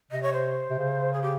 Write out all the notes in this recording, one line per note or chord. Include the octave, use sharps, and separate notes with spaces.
C3 D#5
C#5
C5
C3
C#3
G#4
G4